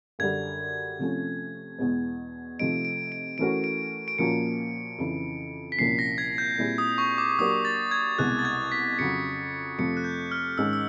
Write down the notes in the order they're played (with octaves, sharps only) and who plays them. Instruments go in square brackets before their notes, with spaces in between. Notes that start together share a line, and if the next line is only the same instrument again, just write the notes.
[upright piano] F#2 D3 G3 [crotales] G#6
[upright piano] C3 F3 A3 C#4
E2 B2 G#3 B3
[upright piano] C3 F3 A3 C4 D#4 [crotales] D7
[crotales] D7
D7
[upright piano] E3 A3 C#4 F#4 A#4 [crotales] D7
[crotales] D7
D7
[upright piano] A#2 F3 A#3 C#4 F#4 [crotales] C#7
[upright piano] F2 C#3 E3
[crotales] B6
[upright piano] C2 A#2 F3 A#3 C#4 [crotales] C7
[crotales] A#6
G#6
G6
[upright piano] A#2 G3 C4 E4 G#4
[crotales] D#6
C#6
D6
[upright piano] F#3 A#3 D4 G4 A#4 [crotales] D#6
[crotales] A6
G#6
[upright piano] C2 B2 G#3 [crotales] F#6
[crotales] A6
G#6
B6
[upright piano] F2 C#3 F#3 [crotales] C#7
[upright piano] F2 C3 F3 A3 C4 [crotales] C#7
[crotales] F#6
G6
F6
[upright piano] G#2 D#3 G#3 C#4 [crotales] E6
[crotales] E6